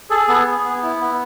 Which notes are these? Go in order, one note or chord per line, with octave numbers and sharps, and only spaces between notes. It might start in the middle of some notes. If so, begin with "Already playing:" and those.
G#4 A4
B3 A4
G#4
B3
E4
B3